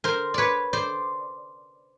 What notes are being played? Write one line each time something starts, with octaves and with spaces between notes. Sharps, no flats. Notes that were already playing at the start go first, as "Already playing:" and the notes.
A#4 C5
B4 C#5 D5
C5 D5